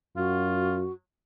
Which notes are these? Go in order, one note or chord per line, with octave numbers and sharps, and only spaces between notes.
F#2 F4 F#4